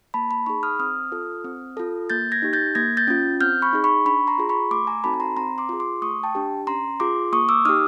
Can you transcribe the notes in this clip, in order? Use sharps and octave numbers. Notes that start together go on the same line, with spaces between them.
A#3 A5 B5
A5 B5
D#4 G#4 B5 C#6
D#6 F6
C4 D#6 F6
F4 A4
C4
F4 A4
A#3 G6 A6
G#6 A#6
D#4 G4
G6 A6
A#3 G#6 A#6
G6 A6
C#4 F4
C4 F6 G6
B5 C#6
D#4 G#4
B5 C#6
D4 B5 C#6
A#5 C6
F4 G#4
B5 C#6
A3 C6 D6
G#5 A#5
C4 D#4 F#4 A4 A5 B5
B5
A#5 C6
C4 A#5 C6
C6 D6
F4 G#4
C6 D6
A3 C#6 D#6
G5 A5
D4 G4
C#4 A#5 C6
F4 G#4 C6 D6
A#3 C#6 D#6
D6 E6
D#4 G4 D#6 F6